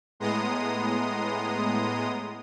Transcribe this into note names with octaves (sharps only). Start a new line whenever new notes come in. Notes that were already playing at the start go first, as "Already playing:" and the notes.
A2 G#3 B3 A#5 C6 D#6